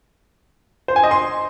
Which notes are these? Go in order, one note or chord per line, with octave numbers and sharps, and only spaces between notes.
C5
G#5
D#5
C6